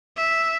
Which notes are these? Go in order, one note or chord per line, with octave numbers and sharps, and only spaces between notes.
E5